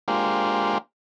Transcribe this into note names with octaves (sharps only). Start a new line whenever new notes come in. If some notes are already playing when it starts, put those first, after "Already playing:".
G#3 A#3 D4 F4 G4 C5